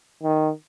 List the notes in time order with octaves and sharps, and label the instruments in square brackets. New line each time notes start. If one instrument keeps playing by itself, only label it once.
[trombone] D#3